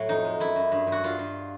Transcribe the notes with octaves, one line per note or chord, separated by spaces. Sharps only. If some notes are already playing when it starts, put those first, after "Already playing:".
Already playing: A2 F#3
F2 D#4
G#3
F#2 E4
F#2
G2
G2
F#4
G2 F4
G2